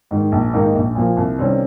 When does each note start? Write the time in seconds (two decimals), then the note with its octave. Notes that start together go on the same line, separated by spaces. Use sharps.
0.11 G#2 D#3
0.32 A#1
0.53 G#2 D#3 A#3 D#4
0.75 A#1
0.95 A#2 F3 A#3
1.17 C2
1.39 C3 D#3 G3 C#4